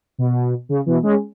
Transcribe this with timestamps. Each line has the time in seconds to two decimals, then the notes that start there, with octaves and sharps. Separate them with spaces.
0.18 B2
0.69 C#3
0.86 B2 E3
1.03 G#3 C#4